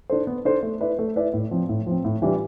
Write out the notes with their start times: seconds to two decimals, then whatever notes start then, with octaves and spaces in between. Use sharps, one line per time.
0.10 D4 A4 C5
0.27 B3
0.45 D4 A4 C5
0.63 A3
0.81 E4 B4 D5
0.99 A3
1.16 E4 B4 D5
1.34 A2
1.51 F3 C4
1.69 A2
1.87 F3 C4
2.05 A2
2.22 E3 G3 D4 F4